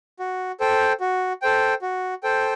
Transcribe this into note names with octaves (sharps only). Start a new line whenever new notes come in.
F#4
A4 C5 G5
F#4
A4 C5 G5
F#4
A4 C5 G5